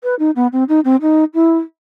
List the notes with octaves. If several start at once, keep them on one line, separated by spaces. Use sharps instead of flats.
B4
D#4
B3
C4
D#4
C4
D#4
E4